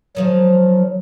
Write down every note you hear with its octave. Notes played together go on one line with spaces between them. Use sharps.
D#3 F3 F#3 G#3